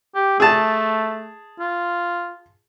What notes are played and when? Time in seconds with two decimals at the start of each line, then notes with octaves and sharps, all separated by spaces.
0.15 G4
0.40 A3 G#4 A5
1.60 F4